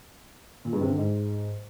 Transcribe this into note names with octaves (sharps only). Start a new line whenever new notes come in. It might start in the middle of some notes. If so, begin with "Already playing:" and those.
A#2
G2
C3
D3
G#2